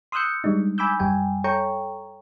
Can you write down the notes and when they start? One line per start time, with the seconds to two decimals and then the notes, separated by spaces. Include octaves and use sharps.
0.12 C6 D#6 E6 F#6 G6 C#7
0.44 G3 G#3 D4 D#4
0.78 G#5 B5 D6 E6 G6
1.00 F#2 G3 G5 G#5
1.44 A4 C#5 G5 A#5 C#6